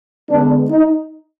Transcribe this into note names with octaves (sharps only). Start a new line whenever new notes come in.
D3 G#3 B3 D4
D#4